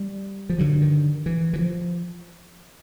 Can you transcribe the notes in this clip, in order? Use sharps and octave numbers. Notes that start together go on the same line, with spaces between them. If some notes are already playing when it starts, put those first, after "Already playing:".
Already playing: G3
F3
G2 D3 F#3
D#3
E3
E3
F3